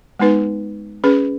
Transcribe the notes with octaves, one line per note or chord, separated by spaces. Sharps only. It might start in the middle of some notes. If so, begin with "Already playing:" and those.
G#3 B3 D#4 B4
C#4 G#4 B4